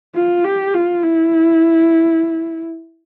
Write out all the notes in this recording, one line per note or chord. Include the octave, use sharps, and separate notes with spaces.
F4
G4
F4
E4